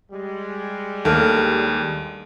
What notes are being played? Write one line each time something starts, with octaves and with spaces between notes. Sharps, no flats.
G3 G#3
D#2 A3 D4 A#4